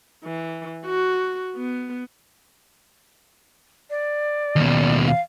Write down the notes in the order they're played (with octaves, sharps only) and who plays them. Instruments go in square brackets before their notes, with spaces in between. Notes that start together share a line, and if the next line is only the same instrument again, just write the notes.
[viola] E3
F#4
B3
[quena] D5
[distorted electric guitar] D#2 B2
[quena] F5